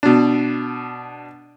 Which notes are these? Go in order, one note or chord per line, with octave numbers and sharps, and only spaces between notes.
B2 D4